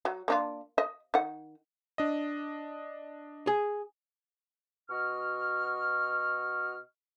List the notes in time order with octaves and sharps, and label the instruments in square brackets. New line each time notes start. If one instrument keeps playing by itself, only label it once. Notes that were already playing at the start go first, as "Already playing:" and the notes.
[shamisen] F#3
A#3 D4 F4
D#5
D#3 F#5
[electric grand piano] D4 D#5
[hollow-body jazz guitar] G#4
[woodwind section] B2 F#4 D#5 C#6 F6